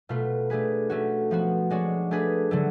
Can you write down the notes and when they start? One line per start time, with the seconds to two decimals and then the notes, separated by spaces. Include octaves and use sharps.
0.09 B2 A3 F4 B4
0.50 A3 D4 G#4 B4
0.89 A3 C#4 F#4
1.31 F3 B3 F#4
1.70 G#3 D4 F#4 C#5
2.11 A3 D4 G#4 B4
2.51 D3 F#3 A3